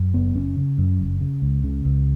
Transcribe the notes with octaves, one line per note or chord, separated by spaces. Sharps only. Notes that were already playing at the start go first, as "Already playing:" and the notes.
Already playing: F#2
F#1 B3
F#1 C#4
C#3
F#2
F#1
C#3
C#2
C#3
C#2